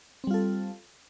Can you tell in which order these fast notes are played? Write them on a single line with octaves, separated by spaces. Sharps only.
C4 G3 F4 A4